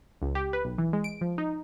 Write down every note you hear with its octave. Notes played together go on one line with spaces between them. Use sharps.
C#2
G4
B4
B1
E3
G#3
D7
F3
D#4